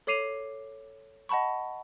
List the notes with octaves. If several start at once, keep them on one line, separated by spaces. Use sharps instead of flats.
A4 C#5 D6 C7 D#7 F7
D#5 F#5 A5 B5 C#6